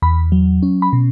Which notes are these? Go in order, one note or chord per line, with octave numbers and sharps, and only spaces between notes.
E2 B5
F#3
C#4
B5
B2